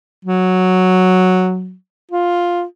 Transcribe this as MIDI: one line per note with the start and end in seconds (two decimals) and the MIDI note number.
0.25 1.74 54
2.11 2.63 65